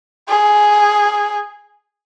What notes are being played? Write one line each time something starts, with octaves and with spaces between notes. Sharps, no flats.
G#4